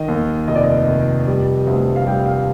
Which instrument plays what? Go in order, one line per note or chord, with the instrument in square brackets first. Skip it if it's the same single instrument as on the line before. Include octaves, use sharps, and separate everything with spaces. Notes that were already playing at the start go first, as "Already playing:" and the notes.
Already playing: [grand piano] D#3 D#5
D#2
F1 D#5
D5
D#5
F1
G3
D2
F5
G3 G5
F5